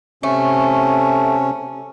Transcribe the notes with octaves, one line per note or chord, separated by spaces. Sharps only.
C3 A3 C#4